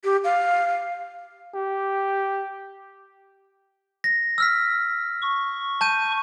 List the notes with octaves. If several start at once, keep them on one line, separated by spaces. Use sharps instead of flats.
G4
F5
G4
A#6
E6 F6 B6
C#6
A5 G6 D#7